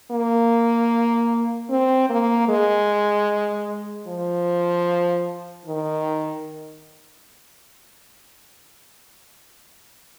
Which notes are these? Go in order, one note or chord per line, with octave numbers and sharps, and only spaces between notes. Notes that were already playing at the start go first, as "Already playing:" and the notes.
A#3
C4
A#3
G#3
F3
D#3